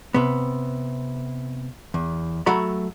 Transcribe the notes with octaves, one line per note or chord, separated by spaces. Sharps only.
C3 B3
E2
F#3 A3 F#4 A#5 B5